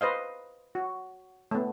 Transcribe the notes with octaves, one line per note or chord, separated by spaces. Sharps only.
B4 C5 D#5 F5
F#4
A3 B3